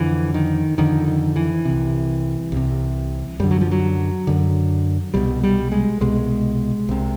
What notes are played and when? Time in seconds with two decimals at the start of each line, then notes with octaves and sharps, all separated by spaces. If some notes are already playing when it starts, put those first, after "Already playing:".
Already playing: F2 D3 E3
0.34 D#3
0.78 F2 D3 D#3
1.08 D#3
1.36 E3
1.65 C2 C3
2.52 C2 C3
3.40 F#2 D3 G3
3.51 F#3
3.61 F3
3.71 F#3
4.27 F#2 D3
5.14 C2 B2 G3
5.43 G3
5.72 G#3
6.01 C2 B2 G#3
6.89 C2 C3